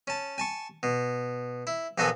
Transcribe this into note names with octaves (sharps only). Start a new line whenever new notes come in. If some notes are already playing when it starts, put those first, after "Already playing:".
C#4 A5
G#5 A5 C#6
B2
E4
A#1 A#3 B3 F#4 A4 G#5